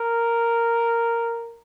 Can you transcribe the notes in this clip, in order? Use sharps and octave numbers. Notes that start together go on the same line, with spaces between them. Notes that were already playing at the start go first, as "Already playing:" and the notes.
Already playing: A#4